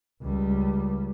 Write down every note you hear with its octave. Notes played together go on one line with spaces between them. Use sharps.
C#2 G3